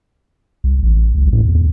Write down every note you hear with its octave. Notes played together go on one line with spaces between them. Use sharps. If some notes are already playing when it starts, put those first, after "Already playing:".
C2
A1
C#2
A2
E2